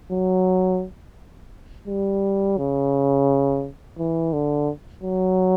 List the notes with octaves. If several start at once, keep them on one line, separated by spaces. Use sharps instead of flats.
F#3
G3
C#3
E3
D3
F#3